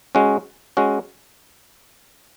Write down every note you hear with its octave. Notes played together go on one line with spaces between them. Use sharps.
G#3 C#4 F#4
G#3 C#4 F#4